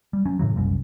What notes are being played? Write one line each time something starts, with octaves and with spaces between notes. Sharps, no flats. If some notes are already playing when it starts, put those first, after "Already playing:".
G3
F#3 C#4
A2 C#3 E3 F#3
F#1 C2 F#2